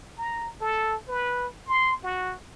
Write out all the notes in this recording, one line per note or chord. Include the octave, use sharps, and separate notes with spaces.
A#5
A4
B4
C6
F#4